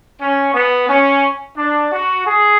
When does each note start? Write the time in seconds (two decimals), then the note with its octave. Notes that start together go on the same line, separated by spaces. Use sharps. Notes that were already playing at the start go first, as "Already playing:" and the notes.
0.20 C#4
0.54 B3
0.89 C#4
1.57 D4
1.92 F#4
2.26 G#4